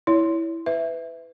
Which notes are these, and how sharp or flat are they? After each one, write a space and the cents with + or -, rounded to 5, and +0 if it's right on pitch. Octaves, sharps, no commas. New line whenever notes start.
E4 +0 C#5 +25
B4 +25 E5 +0